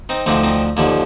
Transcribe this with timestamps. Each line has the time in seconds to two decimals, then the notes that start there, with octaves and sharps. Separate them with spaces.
0.09 C4 D#4
0.26 D2 D3 F3 C4 D#4
0.43 C4 D#4
0.77 D#2 D3 F3